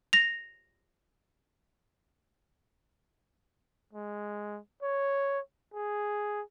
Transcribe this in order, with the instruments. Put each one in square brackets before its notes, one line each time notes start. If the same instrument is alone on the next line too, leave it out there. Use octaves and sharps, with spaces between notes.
[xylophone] A#6 F7
[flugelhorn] G#3
C#5
G#4